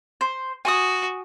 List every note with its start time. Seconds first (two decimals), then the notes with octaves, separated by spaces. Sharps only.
0.21 C5
0.65 F#4 G#5 C#6 D#6